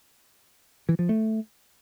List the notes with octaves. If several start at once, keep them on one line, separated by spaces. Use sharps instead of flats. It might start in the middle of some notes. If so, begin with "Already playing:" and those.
E3
F3
A3